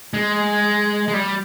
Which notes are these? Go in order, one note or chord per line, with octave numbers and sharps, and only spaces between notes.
G#3
G#3
G3